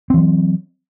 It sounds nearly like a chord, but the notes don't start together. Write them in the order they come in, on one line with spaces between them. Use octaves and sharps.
C4 E3 F#3